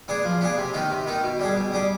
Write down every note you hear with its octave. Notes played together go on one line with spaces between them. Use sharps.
B3 D4 G#4
F3
B3 D4 G#4
C3
D#3 B3 D#4
C3
D#3 B3 D#4
B2
G3 D4 G#4
B2
G3 D4 G#4